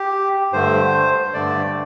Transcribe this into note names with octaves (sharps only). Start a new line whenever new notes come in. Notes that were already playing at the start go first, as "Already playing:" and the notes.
Already playing: G4
G2 D3 A3 C5
G2 D3 A3 D5